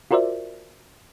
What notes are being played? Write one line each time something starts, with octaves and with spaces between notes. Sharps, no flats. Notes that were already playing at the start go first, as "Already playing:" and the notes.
F4 F#4 A#4 C5 D5 E5